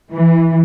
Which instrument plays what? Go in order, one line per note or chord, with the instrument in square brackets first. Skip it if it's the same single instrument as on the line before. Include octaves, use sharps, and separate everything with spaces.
[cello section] E3